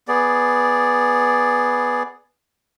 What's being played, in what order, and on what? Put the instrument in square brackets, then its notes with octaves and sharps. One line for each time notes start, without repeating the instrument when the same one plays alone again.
[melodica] B3 G#4 D5